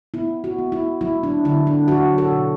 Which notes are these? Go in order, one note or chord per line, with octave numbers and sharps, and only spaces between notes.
B3 E4
F#4
B3
E4
F#3 E4
D4
D3 E4
D4
F#3 F#4
A4
B2